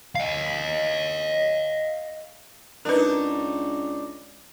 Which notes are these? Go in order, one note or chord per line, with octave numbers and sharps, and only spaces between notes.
D#5 F5
C#2 D4 D#4 A#4 B4